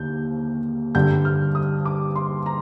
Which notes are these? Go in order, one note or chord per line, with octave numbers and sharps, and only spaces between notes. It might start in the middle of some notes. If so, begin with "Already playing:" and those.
Already playing: D#2 D3 G6
G2 D3 G3 G6
F6
D#6
D6
C6
A#5